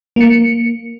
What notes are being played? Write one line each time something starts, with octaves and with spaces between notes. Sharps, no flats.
A#3 C#7